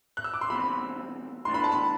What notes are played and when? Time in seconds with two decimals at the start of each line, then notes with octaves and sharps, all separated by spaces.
0.17 F#6
0.24 E6
0.34 D6
0.41 C6
0.50 E2 B2 G3 C4 B5
1.45 B1 A2 E3 B3 D4 C6
1.54 B5
1.64 A5
1.72 B5